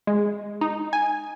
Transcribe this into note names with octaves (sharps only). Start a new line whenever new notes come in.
G#3
D#4
G#5